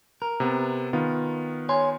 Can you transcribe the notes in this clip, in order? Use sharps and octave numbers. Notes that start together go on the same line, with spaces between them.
A#4
C3 B3
D#3 B3 F4
C#5 G#5 C6